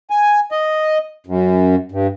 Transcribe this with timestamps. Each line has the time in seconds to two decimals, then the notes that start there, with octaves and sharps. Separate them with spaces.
0.10 G#5
0.52 D#5
1.26 F#2
1.92 G2